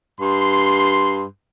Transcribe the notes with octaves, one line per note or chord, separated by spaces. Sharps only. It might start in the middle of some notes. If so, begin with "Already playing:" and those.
G2 C6